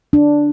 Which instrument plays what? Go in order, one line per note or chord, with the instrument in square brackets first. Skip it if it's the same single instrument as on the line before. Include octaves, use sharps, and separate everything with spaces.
[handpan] D4